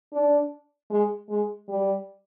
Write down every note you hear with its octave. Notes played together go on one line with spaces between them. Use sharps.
D4
G#3
G#3
G3